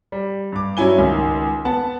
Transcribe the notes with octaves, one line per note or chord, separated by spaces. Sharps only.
G3
G2 D6
G2 F#3 C#4 E4 G#5 G7
C#2 D#3
B3 F#5 A5